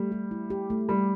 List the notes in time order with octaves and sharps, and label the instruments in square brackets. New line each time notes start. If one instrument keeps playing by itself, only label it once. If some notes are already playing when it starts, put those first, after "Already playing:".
Already playing: [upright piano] G3 [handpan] A3
[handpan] G4
E4
G4
A3
[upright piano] G3 [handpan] G4